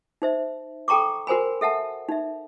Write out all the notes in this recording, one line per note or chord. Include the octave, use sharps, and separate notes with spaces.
D#4 C5 E5
A4 G5 A#5 C#6 D6
F#4 A#4 C5 G#5 B5
A4 E5 F#5 A5
D#4 E5